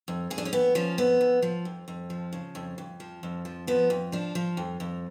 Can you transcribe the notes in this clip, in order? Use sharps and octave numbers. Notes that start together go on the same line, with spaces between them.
F2
F2 G#4
D4
C#4
F2 B3
F3 C#4
F2 B3
F2
F3
F2
F2
F3
C#3
F2
F2
F3
F2
F3
F3 B3
F2
F3 D4
F3
F2
F2